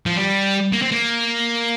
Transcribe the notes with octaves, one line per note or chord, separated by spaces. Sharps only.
F3
G3
A#3
C4
A#3